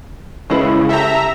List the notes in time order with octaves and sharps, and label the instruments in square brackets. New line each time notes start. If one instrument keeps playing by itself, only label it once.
[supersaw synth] C#3 [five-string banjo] G#3 E4 B4
[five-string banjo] G4 A4 [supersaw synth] E5 A#5